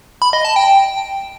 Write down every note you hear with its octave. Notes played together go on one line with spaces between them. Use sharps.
B5
D#5
A5
G5